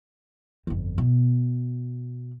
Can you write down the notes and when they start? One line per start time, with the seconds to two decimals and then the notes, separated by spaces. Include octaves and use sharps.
0.67 G1 F2
0.98 B2